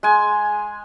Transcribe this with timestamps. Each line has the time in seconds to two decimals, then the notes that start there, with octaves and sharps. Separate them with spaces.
0.03 G#3 G#5